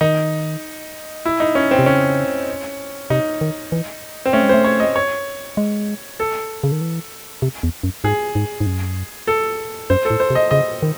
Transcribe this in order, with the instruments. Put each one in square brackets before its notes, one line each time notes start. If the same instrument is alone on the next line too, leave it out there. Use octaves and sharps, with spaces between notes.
[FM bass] D#3 [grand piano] D#4
[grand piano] E4
D#4
C#4
C4
[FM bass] C3
[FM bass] C#3 [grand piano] C#4
[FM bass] C3 [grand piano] D#4
[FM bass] D#3
E3
[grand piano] C4
[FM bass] A3 [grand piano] C#4
[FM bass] G#3
[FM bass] A3 [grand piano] C5
[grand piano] C#5
D#5
C#5
[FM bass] G#3
[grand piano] A4
[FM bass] C#3
D#3
E3
C3
E2
F#2
[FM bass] G#2 [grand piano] G#4
[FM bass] G#2
G#2
F#2
[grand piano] A4
[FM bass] F#2 [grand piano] C5
[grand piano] A4
[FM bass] A2
[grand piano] C5
[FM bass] C3
[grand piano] D#5
[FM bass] C#3 [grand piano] D#5
[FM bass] D#3